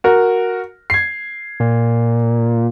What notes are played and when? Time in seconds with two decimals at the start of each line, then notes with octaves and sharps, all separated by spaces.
0.04 F#4 A#4
0.90 G#6 C7
1.60 A#2